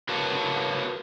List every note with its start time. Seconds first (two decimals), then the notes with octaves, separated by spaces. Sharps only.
0.09 F#4 A#4 B4 C#5 F5 A5